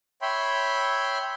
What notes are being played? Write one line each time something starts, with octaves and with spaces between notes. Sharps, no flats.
C#5 E5 G5 B5 C6